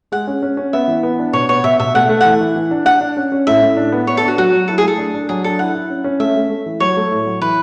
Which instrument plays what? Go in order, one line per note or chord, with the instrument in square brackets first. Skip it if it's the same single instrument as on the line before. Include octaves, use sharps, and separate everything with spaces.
[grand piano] G#3 [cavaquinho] F#5
[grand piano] C#4
C#4
C#4
[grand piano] B3 [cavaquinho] E5
[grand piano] E3
B3
D4
[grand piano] B2 [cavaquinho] C#5
[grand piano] B3 [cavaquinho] C#5
[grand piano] B2 [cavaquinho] E5
[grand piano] B2 [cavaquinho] E5
[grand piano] A3 [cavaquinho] F#5
[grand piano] A3
[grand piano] E3 [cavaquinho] F#5
[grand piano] E3
E3
D4
[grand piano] D4 [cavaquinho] F#5
[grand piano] D4
C#4
C#4
[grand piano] A2 [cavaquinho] E5
[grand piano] A2
D4
B3
[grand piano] B3 [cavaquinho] C#5
[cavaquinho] A4
[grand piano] D4 [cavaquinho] F#4
[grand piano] F#3 [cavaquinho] F#4
[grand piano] F#3
[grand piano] E4 [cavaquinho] A4
[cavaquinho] G#4
[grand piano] A3 [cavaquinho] A4
[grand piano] D4
D4
[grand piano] F#3 [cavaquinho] G#4
[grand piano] D4 [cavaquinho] A4
[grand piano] E4 [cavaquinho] F#5
[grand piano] E4
C#4
C#4
[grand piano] A3 [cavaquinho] E5
[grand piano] A3
A3
E3
[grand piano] F#3 [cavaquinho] C#5
[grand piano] A3
A2
F#3
[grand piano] E3 [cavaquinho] B4